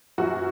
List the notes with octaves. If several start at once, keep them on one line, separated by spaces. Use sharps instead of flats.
F#2 E3 F#4